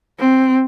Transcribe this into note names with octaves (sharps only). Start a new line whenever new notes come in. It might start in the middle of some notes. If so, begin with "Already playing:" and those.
C4